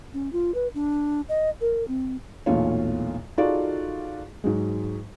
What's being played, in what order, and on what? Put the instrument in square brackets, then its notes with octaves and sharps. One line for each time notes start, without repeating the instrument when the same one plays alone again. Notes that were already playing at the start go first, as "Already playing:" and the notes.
[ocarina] C#4
F4
B4
D4
D#5
A#4
C4
[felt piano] B1 E2 A#2 A3 F4 C#5
D#4 F4 F#4 G#4 A4 D5
G#2 F#3 G#3